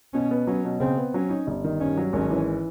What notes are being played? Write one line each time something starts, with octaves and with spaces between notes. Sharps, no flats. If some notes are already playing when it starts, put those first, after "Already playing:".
B2 C#4
B3
F#3 C#4
B2
C#3 C4
B3
F#3 C#4
D#4
G1
D#3
G2 C#4
F#3
G#1 C#4
E3